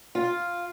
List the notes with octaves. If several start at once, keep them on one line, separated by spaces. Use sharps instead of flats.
F4